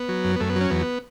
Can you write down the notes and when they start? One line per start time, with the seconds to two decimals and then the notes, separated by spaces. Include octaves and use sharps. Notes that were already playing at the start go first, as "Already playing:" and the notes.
Already playing: B3
0.09 F#3
0.24 F#2
0.36 B3
0.40 F#2 A3
0.50 B3
0.56 F#3
0.61 C#4
0.70 E2 B3